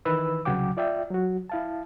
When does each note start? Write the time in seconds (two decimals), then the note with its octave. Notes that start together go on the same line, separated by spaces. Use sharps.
0.05 D#3 E3 B4 E6
0.45 C2 C#3 F#3 F#5 G5 D6
0.77 F4 D5 E5 G5
1.10 F#3 F#4
1.50 E4 F5 A5